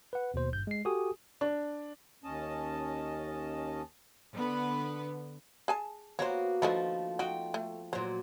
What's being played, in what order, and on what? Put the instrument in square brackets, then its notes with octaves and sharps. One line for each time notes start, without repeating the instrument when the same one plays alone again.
[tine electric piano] B4 F#5
D#2 B2 C5
G#1 G2 G6
G#3 C7
F#4 G4 A4 G#5 D#6
[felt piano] D4
[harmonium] D#2 C#4 D#5 A5
[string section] D3 B3 B4
[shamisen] G#4 G#5 A5
[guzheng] A#3 B3 F#4 [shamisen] C5 C#5
[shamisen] D3 D#3 E4 [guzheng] F3 A3
[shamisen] D#4 F#4 [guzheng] G5
[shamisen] A3
[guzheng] A#2 F#3 [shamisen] C5